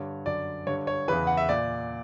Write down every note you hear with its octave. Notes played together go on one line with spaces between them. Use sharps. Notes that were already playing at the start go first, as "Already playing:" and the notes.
Already playing: G2 D3 C#5
F#2 D3 D5
G2 D3 C#5
C#5
E2 C#3 E3 B4
F#5
E5
A#2 D5